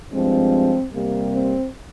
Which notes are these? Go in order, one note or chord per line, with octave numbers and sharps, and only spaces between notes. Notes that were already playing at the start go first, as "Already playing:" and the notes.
G2 F3 G#3 C4
C3 G3 A#3
C4